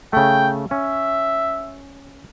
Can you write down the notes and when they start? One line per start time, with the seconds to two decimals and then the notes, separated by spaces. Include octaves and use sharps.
0.13 C#3 A3 G5
0.71 C#4 E5